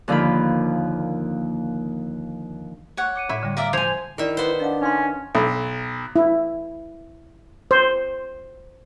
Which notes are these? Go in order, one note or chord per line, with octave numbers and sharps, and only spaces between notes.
D#2 D3 F3 A#3 F4 B5
C#5 F#5
D6 C#7 D#7
A2 E4
D3 G3
A#4 D5 E5 F5
F3 G#5 C6 G6 G#6 F7
D#3 E4 G#4 D5 E5
B3 C5
D4 D#5 F5 F#5
C#4 D#4 F5 C6
B1
E4
C5